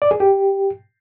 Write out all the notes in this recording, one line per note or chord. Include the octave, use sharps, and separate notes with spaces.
D5
G#4
G4